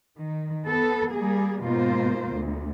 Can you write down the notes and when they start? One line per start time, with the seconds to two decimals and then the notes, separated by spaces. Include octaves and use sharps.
0.19 D#3
0.66 B3 A4
1.14 G3 A#3 G#4
1.61 G#2 B2 A#3 F4 C5
2.31 D2